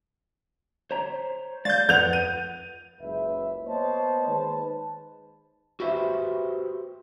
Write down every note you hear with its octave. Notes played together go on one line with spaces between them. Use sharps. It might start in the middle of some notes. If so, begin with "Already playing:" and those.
C5 C#5 A#5
G#3 D5 F5 G6 A6
F2 B4 F#5 G6 F7
D#7
F#1 C#2 B4 E5
A#3 B3 C5 C#5 D#5 A5
D#3 G#3 B4 C5 A5
F#4 G4 B4 C5 E5